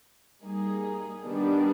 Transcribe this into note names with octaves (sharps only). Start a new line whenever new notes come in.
G3 A#3 D#4 G#4
D#3 G3 B3 D4